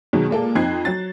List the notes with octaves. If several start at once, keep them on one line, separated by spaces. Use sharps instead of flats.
B2 D#3 F#3 G#3
A#2 G#3 A#3 A4
F2 C4 D#4 F#6 G#6 C7
F#3 A6